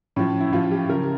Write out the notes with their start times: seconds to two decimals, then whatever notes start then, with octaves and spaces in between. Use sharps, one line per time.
0.16 A2 F3 C#4
0.41 E4
0.52 A2 F3 F4
0.71 G4
0.89 C#3 F3 A#4